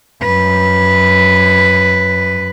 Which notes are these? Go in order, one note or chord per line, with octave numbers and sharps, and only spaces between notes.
F#2 B4